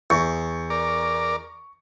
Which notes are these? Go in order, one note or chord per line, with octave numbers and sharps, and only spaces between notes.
E2 C#6 C#7
A#4 D5